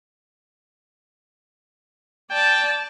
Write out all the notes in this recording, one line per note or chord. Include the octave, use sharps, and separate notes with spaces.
D5 G5 A5